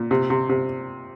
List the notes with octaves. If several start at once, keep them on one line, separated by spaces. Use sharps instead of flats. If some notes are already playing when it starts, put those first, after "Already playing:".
Already playing: A#2
C3
C3
C3